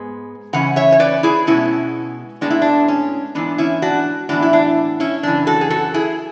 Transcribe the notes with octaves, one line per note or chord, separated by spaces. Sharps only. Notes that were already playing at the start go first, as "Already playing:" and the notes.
Already playing: G#2 G#3 B3
C#3 E3 C#4 F#5
C#5 E5
C#5
B4 D5
E4 G#4
B2 G#3 B3 C#4 E4
A2 G#3 B3 D4
E4
D4
C#4
G#2 E3 B3 D4
C#4 E4
D4 F#4
A2 E3 B3 D4 F#4
E4
D4
C#4 E4
F#2 C#3 E3 D4
F#4 A4
G#4
F#4 A4
E4 G#4